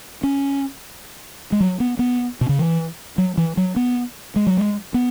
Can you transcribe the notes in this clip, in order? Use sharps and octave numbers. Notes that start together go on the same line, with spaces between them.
C#4
G#3
F#3
B3
B3
B2
C#3
E3
F#3
E3
F#3
B3
G#3
F#3
G#3
B3